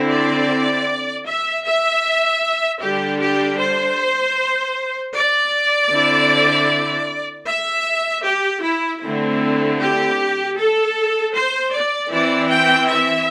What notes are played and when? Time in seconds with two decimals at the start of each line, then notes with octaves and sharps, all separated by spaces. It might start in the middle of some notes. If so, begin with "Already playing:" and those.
Already playing: D3 C4 E4
0.11 D5
1.26 E5
1.65 E5
2.81 D3 G3 D4 G4
3.21 G4
3.59 C5
5.15 D5
5.91 D3 C4 E4
7.47 E5
8.25 G4
8.63 E4
9.02 D3 A3 C4 E4
9.80 G4
10.57 A4
11.34 C5
11.73 D5
12.12 E3 C4 E4 D5
12.50 G5
12.89 E5